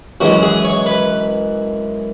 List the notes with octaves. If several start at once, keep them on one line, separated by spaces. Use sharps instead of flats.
F#2 E3 G#3 F#4
G#4
C#5
B4